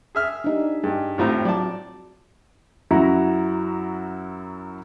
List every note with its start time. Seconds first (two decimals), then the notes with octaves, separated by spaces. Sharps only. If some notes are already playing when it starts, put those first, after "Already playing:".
0.15 G#4 E5 F6
0.44 D4 D#4 G4
0.84 G2 G#4
1.18 G#1 A2 C4 F4 G4 A#5
1.45 F#3 D5 A5
2.91 F#2 E4 F#4 A#5